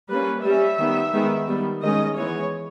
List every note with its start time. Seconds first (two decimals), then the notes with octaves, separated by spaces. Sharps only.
0.10 G3 A#3 C#4 B4
0.45 G3 C#4 E5
0.79 D#3 G3 B3
1.13 D#3 G#3 B3
1.48 D#3 G3 B3
1.82 D#3 G#3 C#4 D#5
2.17 E3 G#3 B3 C#5